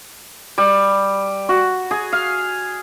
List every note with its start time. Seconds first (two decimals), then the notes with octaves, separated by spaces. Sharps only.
0.58 G3
1.49 F#4
1.91 G#4
2.13 F5